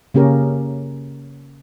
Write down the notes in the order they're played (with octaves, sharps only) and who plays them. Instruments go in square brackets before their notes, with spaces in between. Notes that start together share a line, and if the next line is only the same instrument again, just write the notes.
[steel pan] C#3 A#3 C#4 G4 G#4 A#4